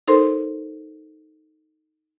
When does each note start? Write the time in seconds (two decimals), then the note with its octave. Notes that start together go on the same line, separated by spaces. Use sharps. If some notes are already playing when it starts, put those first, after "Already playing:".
0.08 D#4 A4 A#4 C5 C6